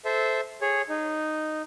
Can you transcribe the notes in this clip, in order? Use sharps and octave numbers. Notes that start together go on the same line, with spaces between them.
A4 C5 E5
G#4 C#5
D#4